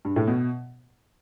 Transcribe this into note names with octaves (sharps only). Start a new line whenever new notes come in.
G2
A2
B2